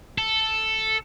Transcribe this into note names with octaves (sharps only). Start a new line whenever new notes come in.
A4